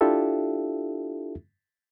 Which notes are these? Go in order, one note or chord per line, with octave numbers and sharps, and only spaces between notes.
D4 E4 F4 G4 A4 E5